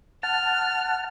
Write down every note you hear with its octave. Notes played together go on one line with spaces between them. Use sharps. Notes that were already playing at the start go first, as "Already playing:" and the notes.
F#5 A5 F6